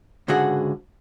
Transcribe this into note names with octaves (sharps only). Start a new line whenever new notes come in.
C#2 G#2 D3 F#4 G#4 F#5